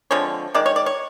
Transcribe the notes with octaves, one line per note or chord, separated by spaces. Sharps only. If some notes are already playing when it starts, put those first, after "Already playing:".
D3 F3 G#3 C4 C#5
D#3 G#3 D5
C#5
D5
C#5